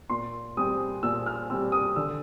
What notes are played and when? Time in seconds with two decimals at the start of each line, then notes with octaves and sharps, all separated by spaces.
0.10 A#2 C6
0.57 G3 C4 D#6
1.03 A#2 E6
1.26 F6
1.50 G3 C4 E6
1.72 D#6
1.96 D3 E6